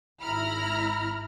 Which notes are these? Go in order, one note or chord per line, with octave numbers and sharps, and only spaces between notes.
G#1 E4 A#5 B5 F6